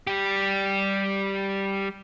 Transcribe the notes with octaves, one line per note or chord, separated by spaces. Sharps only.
G3 G4